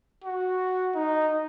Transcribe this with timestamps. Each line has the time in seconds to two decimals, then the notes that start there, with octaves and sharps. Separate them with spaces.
0.24 F#4
0.95 D#4